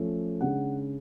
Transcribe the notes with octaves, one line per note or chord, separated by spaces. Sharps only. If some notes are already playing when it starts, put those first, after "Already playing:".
Already playing: F3 A3 C#4
C#3 G#3 D4 F#5